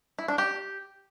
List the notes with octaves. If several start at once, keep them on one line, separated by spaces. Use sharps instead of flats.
E4
D4
G4